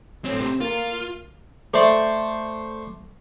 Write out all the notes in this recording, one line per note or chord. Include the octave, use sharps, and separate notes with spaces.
A2 F#3 C4 C#4
C3 G4 C5
A#3 F4 A#4
A3 C5 D5